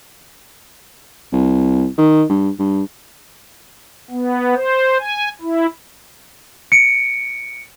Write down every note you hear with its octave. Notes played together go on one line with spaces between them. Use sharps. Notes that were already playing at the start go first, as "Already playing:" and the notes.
C2
D#3
G2
G2
B3
C5
G#5
E4
C#7 D7